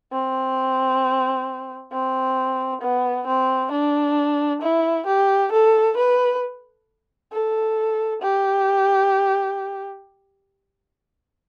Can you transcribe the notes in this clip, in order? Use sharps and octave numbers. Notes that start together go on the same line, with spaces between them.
C4
C4
B3
C4
D4
E4
G4
A4
B4
A4
G4